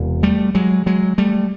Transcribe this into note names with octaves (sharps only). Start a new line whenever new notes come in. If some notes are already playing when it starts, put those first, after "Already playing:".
Already playing: E1 E2 C3
G3 A3
F#3 G#3
F#3 G#3
G3 A3